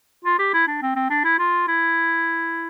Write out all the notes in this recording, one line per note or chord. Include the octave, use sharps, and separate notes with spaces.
F4
G4
E4
D4
C4
C4
D4
E4
F4
E4